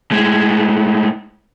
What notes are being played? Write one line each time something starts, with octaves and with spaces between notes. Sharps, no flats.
A2 G#3